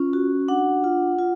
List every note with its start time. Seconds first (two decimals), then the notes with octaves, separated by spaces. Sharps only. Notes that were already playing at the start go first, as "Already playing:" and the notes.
Already playing: C#4 F4
0.13 F#4
0.48 D4 F#5
0.84 F4
1.19 F4